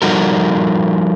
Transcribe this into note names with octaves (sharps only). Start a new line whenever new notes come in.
F3 G3 D#4 F#4 A4 A#4